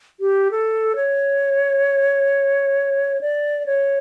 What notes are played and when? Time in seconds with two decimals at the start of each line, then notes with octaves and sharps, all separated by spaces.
0.20 G4
0.51 A4
0.96 C#5
3.21 D5
3.66 C#5